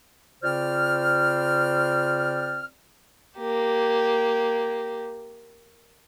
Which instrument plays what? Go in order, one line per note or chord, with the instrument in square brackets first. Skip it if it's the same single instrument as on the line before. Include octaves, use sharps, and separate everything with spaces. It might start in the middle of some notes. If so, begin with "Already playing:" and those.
[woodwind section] C#3 C4 F4 C5 D5 F6
[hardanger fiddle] A#3 G4